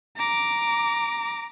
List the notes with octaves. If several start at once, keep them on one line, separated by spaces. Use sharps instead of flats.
A#5 D6